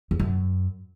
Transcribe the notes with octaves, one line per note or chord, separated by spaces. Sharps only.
E2
F#2